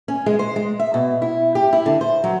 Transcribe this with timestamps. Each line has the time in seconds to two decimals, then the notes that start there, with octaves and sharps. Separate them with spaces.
0.08 C#4
0.26 G#3
0.39 C5
0.56 G#3
0.79 E5
0.94 B2
1.22 E4
1.55 G4
1.73 E4
1.86 D3
2.01 C5
2.24 F#3